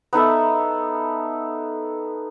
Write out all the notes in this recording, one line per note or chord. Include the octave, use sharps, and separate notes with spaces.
B3 D#4 A4 E5